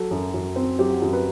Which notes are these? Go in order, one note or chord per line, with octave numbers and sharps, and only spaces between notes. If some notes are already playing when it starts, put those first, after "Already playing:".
Already playing: F#3 A4
F#2
F#2
C4
F#3 G4
F#4
F#2 G4
B4